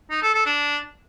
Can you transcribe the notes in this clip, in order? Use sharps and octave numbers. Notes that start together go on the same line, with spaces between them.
D#4
A4
A4
D4